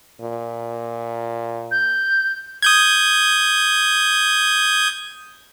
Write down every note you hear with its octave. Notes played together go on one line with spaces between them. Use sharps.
A#2
G6
D#6 G6 G#6